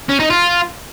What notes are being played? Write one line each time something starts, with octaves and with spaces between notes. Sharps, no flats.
C#4
D#4
F4